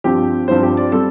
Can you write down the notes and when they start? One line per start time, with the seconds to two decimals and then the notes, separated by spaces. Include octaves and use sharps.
0.04 G2 F3 C4 G4
0.48 G2 F3 C4 C5
0.63 G4
0.77 D5
0.92 G3 C4 A4